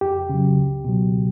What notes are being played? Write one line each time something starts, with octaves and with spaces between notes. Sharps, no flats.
F2 G4
C#3 F#3
C#2
B2 F#3